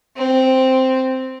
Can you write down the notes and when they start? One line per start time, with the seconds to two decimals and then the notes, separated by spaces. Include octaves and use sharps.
0.17 C4